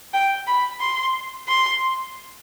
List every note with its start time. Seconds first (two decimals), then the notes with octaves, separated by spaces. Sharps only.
0.13 G5
0.47 B5
0.80 C6
1.48 C6